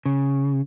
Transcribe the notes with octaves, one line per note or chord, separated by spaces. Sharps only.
C#3